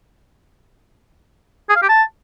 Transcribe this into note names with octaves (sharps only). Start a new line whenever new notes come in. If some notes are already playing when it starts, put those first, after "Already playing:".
G#4
F5
G4
A5